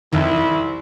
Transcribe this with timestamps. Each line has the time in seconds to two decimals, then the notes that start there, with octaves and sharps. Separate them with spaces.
0.13 C2 F2 D#3 E4